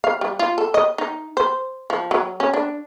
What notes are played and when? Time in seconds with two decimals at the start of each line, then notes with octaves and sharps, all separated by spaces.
0.04 F5
0.21 G3
0.39 F4
0.58 A4
0.74 D#5
0.98 D#4
1.37 C5
1.90 F3
2.11 F#3
2.40 C#4
2.53 D4